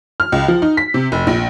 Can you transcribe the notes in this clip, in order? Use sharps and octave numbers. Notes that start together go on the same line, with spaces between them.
F6
C#2
F3
D#4
B6
C3
F1
A#1